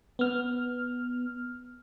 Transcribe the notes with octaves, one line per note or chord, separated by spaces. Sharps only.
B3 F6